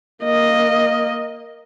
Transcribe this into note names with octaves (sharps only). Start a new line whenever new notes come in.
A#3 D#5